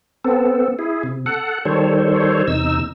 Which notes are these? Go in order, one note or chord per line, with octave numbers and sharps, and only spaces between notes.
B3 C4 A4
E4 G#4
C3
A4 F#5
D#3 G3 A4 C5 C#5
E2 C3 D#4 E6